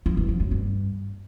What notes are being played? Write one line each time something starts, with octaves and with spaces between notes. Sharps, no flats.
F3
E2
F3
F#2
G2